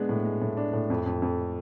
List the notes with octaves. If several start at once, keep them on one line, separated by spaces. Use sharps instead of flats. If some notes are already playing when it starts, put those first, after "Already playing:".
Already playing: G#3 B3 D4
A2
G#3
A2
D4
A2
F2
F2
F2